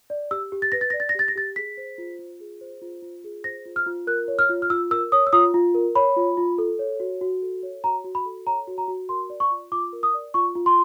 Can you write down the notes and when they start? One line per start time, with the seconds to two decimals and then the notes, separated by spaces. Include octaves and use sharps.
0.10 D5
0.31 G4 E6
0.52 G4
0.62 A6
0.72 B4 A#6
0.81 A6
0.90 D5 A#6
1.00 A6
1.09 A#6
1.15 G4 A6
1.28 A#6
1.35 G4 A6
1.56 G#4 B6
1.77 C5
1.98 F4
2.19 F4
2.40 G#4
2.61 C5
2.82 F4
3.02 F4
3.24 G#4
3.44 C5 A#6
3.66 F4
3.76 F6
3.86 F4
4.07 A#4 F#6
4.28 C#5
4.39 F6
4.49 F4
4.62 F6
4.70 F4 E6
4.91 A#4 E6
5.12 C#5 D#6
5.27 E6
5.33 F4 D#6
5.54 F4
5.74 A#4
5.95 C#5 B5
6.16 F4
6.37 F4
6.58 A4
6.79 C#5
7.00 F#4
7.21 F#4
7.42 A4
7.63 C#5
7.84 F#4 A#5
8.04 F#4
8.15 B5
8.25 A4
8.46 C#5 A#5
8.67 F#4
8.78 A#5
8.88 F#4
9.09 A#4 C6
9.30 D5
9.40 C#6
9.51 F4
9.72 F4 D6
9.93 A#4
10.03 D#6
10.14 D5
10.34 F4 C#6
10.55 F4
10.66 C6